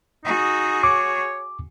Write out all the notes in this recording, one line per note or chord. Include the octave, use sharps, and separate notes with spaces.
D#4 F#4 G#4
C#5 D6